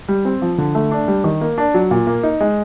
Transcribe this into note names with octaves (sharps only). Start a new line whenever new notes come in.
G3
C4
F3
D3
A3
D4
G3
D#3
A#3
D4
F#3
A#2
A#3
D#4
G#3